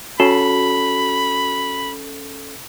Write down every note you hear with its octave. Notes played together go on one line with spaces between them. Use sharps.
C#4 F#4 A4 B5